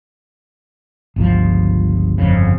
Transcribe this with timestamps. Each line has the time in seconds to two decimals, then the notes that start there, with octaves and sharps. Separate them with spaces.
1.16 G1 C#2 F3
2.18 G1 F2 C#3